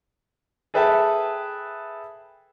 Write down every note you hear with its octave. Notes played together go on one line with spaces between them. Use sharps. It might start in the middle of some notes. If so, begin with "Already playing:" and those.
G#4 A4 B4 E5 G5 A5